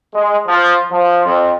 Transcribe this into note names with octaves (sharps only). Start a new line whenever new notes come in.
G#3
F3
F3
F2